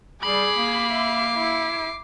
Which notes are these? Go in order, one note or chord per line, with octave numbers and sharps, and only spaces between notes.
G3 G#4 B5 D6 C7
A#3
E5
E4